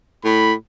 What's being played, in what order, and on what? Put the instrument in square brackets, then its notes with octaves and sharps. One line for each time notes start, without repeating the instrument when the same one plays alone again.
[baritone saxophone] A2 [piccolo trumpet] B5